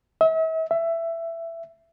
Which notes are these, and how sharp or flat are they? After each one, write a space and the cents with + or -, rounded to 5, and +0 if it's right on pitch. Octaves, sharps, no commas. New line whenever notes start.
E5 -40
E5 +15